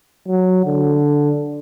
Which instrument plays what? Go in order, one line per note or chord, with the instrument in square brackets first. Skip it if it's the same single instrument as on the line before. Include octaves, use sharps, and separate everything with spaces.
[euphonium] F#3
D3